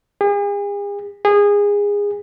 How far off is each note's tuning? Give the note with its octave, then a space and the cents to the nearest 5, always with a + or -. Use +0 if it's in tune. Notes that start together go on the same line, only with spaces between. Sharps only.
G#4 -45
G#4 -25